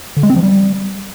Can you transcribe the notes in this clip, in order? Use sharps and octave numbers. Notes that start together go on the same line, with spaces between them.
D3
G#3
C4
F3
G3